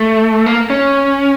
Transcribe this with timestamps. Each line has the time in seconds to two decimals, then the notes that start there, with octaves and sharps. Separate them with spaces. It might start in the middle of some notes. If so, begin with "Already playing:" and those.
Already playing: A3
0.46 A#3
0.70 C#4